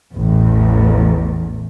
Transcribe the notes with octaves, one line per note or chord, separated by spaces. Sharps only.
A1 E2